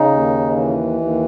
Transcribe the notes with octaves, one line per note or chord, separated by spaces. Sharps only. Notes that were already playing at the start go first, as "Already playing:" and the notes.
Already playing: C#3 D#4
D#2
E3
D#2